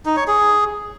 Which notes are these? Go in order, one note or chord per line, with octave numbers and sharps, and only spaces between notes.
D#4
C#5
G#4